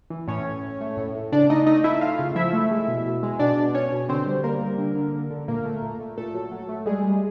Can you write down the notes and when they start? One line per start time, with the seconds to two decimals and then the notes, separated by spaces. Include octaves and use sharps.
0.10 E3
0.28 A2 C#4 C#5
0.46 A2
0.63 A2
0.81 A3
0.97 A2
1.15 A2
1.32 C#3 D4 D5
1.50 A3 D#4 D#5
1.67 A3 D#4 D#5
1.84 A3 E4 E5
2.01 A3 F4 F5
2.19 C#3
2.35 F3 E4 E5
2.53 A3
2.71 G#3
2.88 B2
3.06 B2
3.23 G#3
3.39 B2 D4 D5
3.57 B2
3.74 B2 C#4 C#5
3.92 B2
4.09 D3 C4 C5
4.26 G3
4.44 G3 A#3 A#4
4.61 G3
4.78 D3
4.95 D3
5.13 D3
5.30 D3
5.48 A#2 A#3 A#4
5.65 A3
5.82 A#2
6.00 A3
6.17 A#2 A3 A4
6.34 F#3
6.52 F#3
6.69 A3
6.86 G3 G#3 G#4
7.04 G3